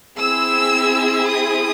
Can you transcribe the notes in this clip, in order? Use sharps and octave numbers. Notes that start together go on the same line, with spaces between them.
C4 E4 G#4 E6
D#6